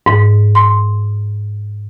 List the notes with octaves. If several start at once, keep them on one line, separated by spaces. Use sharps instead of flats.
G#2
C6